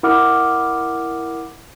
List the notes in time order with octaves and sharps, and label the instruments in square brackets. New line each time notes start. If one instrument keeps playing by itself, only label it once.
[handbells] E4 A#4 F#5 D6 D#6 F6